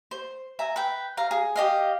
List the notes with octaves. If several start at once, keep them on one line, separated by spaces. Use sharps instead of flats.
C5
E5 G#5 A#5
B4 G5
F5 A#5
G#4
G4 D#5 F5